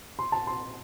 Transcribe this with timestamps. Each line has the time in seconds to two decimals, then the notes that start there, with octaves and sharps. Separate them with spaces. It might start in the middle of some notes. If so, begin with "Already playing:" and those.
0.19 C6
0.32 A5
0.47 C6